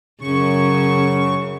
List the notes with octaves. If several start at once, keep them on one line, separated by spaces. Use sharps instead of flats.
F#2 C#3 C#6